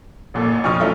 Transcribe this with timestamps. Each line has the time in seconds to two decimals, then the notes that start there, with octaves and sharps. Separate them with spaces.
0.34 A1 A#2 A4
0.64 F2 B2 C#6 D#6 F6
0.80 F#3 A3 C#4 E4 F4 C#5